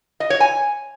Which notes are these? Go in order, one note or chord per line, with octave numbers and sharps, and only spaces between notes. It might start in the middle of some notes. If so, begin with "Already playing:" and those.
D#5
C#5
G#5